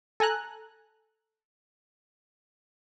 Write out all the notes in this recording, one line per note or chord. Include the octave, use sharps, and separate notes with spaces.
A4 G#5 A#5 F#6